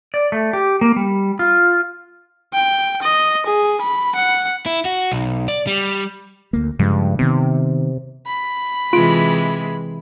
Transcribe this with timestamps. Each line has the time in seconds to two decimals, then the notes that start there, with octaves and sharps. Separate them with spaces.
0.14 D5
0.32 A3
0.53 G4
0.81 A#3
0.96 G3
1.39 F4
2.54 G5
3.02 D#5
3.47 G#4
3.81 B5
4.16 F#5
4.66 E4
4.85 F#4
5.12 B1
5.48 D5
5.67 G3
6.53 D2 A#3
6.79 G2 C#3 F3 G#3
7.19 C3 D#3 B3
8.27 B5
8.93 C3 E3 G#3 F4 D7